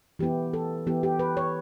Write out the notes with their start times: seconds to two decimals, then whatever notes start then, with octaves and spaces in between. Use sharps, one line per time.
0.19 E3 B3 E4 G4
0.54 A4
0.87 E3 B3 E4 G4
1.03 G4
1.19 B4
1.37 C#5